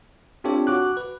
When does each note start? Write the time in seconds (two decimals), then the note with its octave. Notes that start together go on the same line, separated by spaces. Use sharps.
0.44 C4 D4 F4 G4 A4 C#5
0.67 F#4 D6 F#6
0.97 B4